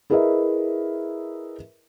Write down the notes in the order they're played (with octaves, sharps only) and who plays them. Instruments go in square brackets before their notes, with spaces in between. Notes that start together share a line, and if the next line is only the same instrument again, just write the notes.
[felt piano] E4 G#4 A#4 B4 D#5 E5